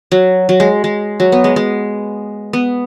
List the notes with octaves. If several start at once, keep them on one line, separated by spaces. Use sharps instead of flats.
F#3
F#3
G#3
G#3
F#3
B3
G#3
G#3
B3